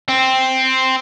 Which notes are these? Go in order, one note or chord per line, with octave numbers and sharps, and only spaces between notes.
C4